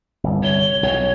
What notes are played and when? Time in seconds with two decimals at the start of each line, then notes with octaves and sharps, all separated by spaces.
0.24 G1 C2
0.43 C#5 G7
0.83 B1 C#5